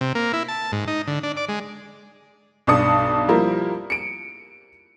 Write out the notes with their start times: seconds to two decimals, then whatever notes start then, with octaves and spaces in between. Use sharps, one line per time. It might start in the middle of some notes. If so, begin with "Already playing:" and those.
0.01 C3
0.15 A#3
0.33 E4
0.48 A5
0.72 G#2
0.88 D#4
1.07 D3
1.23 D4
1.37 D5
1.49 G#3
2.67 B1 G2 D5 A5 D#6 C#7
3.28 F3 G3 A#3 E4 F4 A#4
3.90 C#7 D7